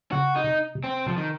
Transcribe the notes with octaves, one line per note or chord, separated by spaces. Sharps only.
C#3 F#4
D#4
C3
C3
C4
C3 F3
D#3